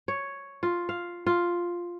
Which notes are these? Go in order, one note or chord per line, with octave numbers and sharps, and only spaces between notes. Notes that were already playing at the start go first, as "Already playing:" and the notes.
C#5
F4
F5
F4